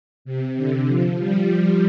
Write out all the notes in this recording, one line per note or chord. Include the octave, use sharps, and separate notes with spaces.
C3
D3
F3
G3